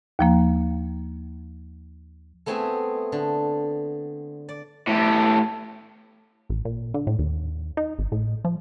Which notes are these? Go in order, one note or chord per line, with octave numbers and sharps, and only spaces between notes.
D#2 F3 A#3
A3 B3 C4 E4 G#4 E5
D3
D5
A2 G4
A1
A#2
D3
A2
D#2
D#4
G#1
A2
F3